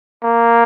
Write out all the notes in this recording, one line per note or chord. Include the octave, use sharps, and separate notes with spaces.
A#3